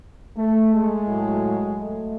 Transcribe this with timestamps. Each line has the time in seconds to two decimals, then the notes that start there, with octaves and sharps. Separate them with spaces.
0.37 A3
0.73 G#3
1.07 A2 F#3
1.78 A3